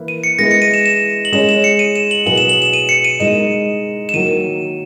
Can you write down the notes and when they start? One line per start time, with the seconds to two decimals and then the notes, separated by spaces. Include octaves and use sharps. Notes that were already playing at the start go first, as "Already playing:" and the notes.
Already playing: E3 A#3 E4 B4
0.08 D#7
0.24 C#7
0.39 G#3 B3 E4 A#6
0.51 C#7
0.62 D#7
0.74 E7
0.86 E7
1.25 F#7
1.32 G#3 C#4 G#4 C#5 E7
1.49 E7
1.64 C#7
1.79 D#7
1.95 E7
2.11 F#7
2.26 B2 F#3 B3 E4 G#4 F#7
2.38 E7
2.49 F#7
2.62 E7
2.74 D#7
2.89 C#7
3.04 D#7
3.20 G#3 D#4 A#4 D#5 E7
4.09 E7
4.14 D#3 F#3 A#3 D#7